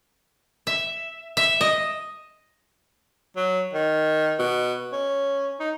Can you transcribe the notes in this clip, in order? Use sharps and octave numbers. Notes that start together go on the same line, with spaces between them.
E5
E5
D#5
F#3
D#3
B2
C#4
D#4